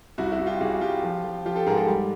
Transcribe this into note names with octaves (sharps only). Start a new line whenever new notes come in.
C2 E4 F#4
E4 F#4
C2
F4 G4
C2 F#4 G#4
C2 F4 G4
F3
F3
F3 F4 G4
G4 A4
G#2 G#4 A#4
G4 A4
G3